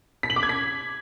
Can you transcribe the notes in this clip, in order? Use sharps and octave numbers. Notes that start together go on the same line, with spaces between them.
B6
F#7
D6
G#6
B6